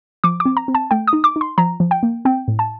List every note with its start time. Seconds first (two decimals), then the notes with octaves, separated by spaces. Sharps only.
0.24 F3 D6
0.40 D6
0.45 C4
0.57 A#5
0.68 C4
0.75 A5
0.91 A3 G5
1.07 D#6
1.13 D#4
1.24 D6
1.36 D#4
1.41 C6
1.58 F3 A#5
1.80 F3
1.91 G5
2.03 A#3
2.25 C4 G5
2.48 A2
2.59 A5